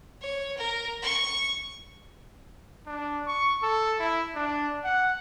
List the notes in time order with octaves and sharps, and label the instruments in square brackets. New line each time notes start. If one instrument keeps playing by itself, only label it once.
[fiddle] C#5
A#4
C#6
[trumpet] D4
C#6
A4
E4
D4
F#5